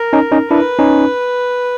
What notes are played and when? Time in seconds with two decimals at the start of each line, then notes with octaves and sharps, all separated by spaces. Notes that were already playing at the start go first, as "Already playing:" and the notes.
Already playing: A#4
0.13 C#4 D#4
0.32 C#4 D#4
0.51 D4 E4 B4
0.79 C#4 D#4